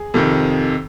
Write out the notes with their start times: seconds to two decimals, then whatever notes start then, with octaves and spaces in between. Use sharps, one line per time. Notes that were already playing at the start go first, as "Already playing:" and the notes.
Already playing: G#4
0.14 F2 C3 D#3